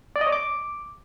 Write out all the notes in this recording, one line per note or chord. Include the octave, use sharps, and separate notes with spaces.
D5
D#5
C#5
D6